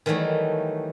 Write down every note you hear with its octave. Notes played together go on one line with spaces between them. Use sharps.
D#3 E3 F#3 G3 A3